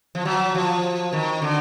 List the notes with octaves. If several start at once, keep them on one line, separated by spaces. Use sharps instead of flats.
F3
F#3
F3
D#3
D3